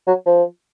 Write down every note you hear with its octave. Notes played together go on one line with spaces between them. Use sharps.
F#3
F3